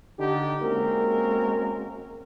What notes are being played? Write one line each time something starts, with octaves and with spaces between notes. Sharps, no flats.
D3 D#4 G4
G#3 A#3 C4 C#4 F#4 A#4